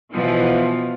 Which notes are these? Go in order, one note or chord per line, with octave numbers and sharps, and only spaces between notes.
B2 E3 F3